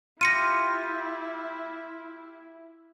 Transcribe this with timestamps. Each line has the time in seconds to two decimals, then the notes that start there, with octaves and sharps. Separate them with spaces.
0.21 E4 F4 G4 A#6 C#7 D#7